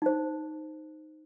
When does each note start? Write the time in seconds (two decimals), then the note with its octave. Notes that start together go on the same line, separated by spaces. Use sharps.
0.02 D#4 C5